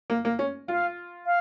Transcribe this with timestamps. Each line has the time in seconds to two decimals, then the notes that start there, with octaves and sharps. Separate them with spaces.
0.10 A#3
0.25 A#3
0.39 C#4
0.68 F4 F5
1.25 F5